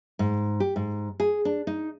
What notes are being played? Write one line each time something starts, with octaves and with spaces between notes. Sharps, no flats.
G#2
G4
G#2
G#4
D4
D#4